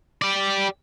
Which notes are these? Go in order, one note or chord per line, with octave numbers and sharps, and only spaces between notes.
G4 D5